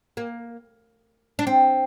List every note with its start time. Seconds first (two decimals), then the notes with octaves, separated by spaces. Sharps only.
0.17 A#3
1.39 D4
1.47 C4